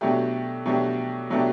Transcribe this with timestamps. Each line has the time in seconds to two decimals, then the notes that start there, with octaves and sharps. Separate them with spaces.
0.01 B2 F#3 A3 D4 G4
0.66 B2 F#3 A3 D4 G4
1.30 B2 F#3 A3 D4 G4